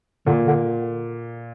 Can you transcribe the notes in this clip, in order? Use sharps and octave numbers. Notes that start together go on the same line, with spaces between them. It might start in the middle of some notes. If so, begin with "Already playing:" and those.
A#2 D3
D3